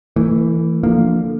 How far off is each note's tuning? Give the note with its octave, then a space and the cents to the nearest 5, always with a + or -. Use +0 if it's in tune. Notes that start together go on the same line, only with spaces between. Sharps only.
E3 +0 A3 +40
D3 +0 F3 +0 A#3 -5